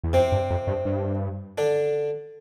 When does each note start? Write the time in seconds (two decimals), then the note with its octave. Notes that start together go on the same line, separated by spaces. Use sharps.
0.04 E2
0.13 F2 C3 C4
0.32 G2
0.50 F2
0.67 G2
0.85 G2
1.58 D3 D4